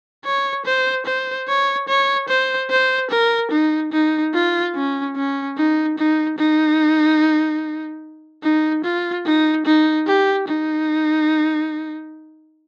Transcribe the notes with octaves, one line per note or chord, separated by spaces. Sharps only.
C#5
C5
C5
C#5
C#5
C5
C5
A#4
D#4
D#4
F4
C#4
C#4
D#4
D#4
D#4
D#4
F4
D#4
D#4
G4
D#4